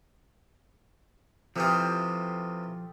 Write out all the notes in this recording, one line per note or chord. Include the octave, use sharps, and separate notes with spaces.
C3 E3 F3 F4 G4 A4 D#6